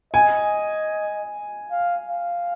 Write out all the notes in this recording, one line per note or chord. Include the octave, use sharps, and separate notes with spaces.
D#5 G#5
F5
F5